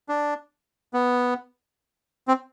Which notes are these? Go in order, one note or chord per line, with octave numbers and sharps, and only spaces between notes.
D4
B3
C4